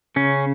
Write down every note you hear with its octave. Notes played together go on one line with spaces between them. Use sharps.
C#3 C#4